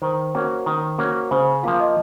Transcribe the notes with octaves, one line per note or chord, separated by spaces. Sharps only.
D#3 C5
A#3 C#4 F#4
D#3
A#3 C#4 F#4
C#3 C5
F3 A#3 F4 F5
D#5